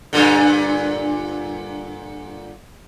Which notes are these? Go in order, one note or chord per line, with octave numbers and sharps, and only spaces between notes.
G2 A#2 D3